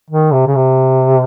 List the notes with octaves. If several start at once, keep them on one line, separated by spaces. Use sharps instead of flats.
D#3
C3
C#3
C3